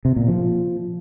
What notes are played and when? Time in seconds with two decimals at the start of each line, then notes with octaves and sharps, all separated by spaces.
0.05 C3
0.16 A#2
0.28 F3